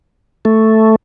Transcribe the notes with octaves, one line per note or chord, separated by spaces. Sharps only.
A3